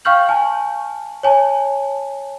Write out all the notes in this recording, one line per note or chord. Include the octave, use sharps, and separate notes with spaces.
F5 G5 C#6 F6 G6 F#7
G#5 A5
C#5 G#5 A5